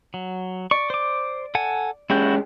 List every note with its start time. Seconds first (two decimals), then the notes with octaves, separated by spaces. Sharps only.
0.14 F#3
0.71 D5 C#6
0.90 C5 D6
1.55 A4 F#5 G#5
2.10 G#3 C#4 E4 F#4 G4 G6